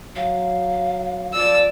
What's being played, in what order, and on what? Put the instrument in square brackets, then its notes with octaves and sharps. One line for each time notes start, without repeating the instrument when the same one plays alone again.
[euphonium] F#3 [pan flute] F5
[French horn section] F3 D5 [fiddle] E6